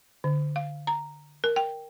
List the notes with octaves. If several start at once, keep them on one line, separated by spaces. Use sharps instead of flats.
D3
F5
A#5
A#4
G5